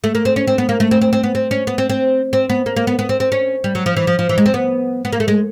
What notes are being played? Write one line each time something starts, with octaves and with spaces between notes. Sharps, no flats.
A3
A#3
C4
C#4
C4
B3
A#3
A3
C4
C4
C4
B3
C4
C#4
B3
C4
C4
C4
B3
A#3
A#3
B3
B3
C4
C4
C#4
G3
F#3
F3
E3
F3
F3
E3
G#3
C4
B3
B3
A#3
A3
G#3